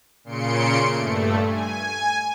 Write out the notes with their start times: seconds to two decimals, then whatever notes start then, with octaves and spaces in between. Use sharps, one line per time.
0.24 A#2 C#3 C6 C#7 D7
0.95 G2 A3
1.46 G#5